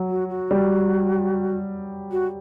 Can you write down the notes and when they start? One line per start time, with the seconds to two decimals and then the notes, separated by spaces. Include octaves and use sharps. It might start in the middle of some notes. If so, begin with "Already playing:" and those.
Already playing: F#3
0.10 F#4
0.30 F#4
0.51 G3
2.12 F#4